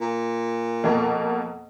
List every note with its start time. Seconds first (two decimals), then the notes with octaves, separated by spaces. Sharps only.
0.01 A#2
0.84 F2 B2 A#3